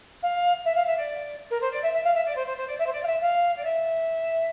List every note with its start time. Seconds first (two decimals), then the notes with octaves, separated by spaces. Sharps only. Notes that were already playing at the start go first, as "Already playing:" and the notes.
0.22 F5
0.65 E5
0.75 F5
0.86 E5
0.97 D5
1.50 A#4
1.61 C5
1.71 D5
1.82 E5
1.93 E5
2.04 F5
2.14 E5
2.25 D5
2.36 C5
2.46 C5
2.57 C5
2.67 D5
2.79 E5
2.86 C5
2.92 D5
3.03 F5
3.06 E5
3.21 F5
3.57 D5
3.64 E5